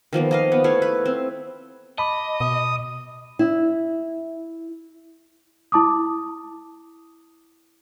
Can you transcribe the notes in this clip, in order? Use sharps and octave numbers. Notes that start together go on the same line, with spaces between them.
D#3 F3 A#3 B3
A#3 D#5 F5
B3
A3 E4 C#5 F5
B4
C4
D#5 A5 B5 D6
B2 D#6
E4
E4 A5 D6 D#6